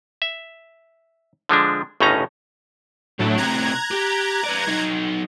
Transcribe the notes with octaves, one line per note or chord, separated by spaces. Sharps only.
E5
D3 F3 G#3 D4
G1 A2 C#3 C#4 D#4 A#5
D#2 A2 F#3 A3 D4
A2 C3 A#5 F#6 G#6
G4
B4 D5
F#3 D#4